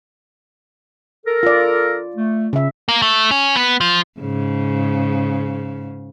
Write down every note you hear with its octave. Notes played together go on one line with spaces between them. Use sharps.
A4 A#4
F4 D5
A3
C#3 E5
A#3
A3
C#4
B3
F3
G#2 C#3